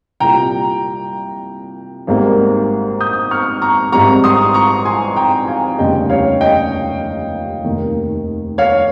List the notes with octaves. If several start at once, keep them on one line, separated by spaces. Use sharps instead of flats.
C2 A#2 G3 G5 A#5
G#1 G#2 G3 A#3
D#6 G6
C#6 F6
A#5 C#6
G#1 G#2 G3 C4 A#5 C#6
C6 D#6
A#5 C#6
G#5 C6
G5 A#5
F5 G#5
F1 D#2 C#3 G3 D#5 G5
C#5 F5
D#5 G5
F1 D#2 D#3
C#5 F5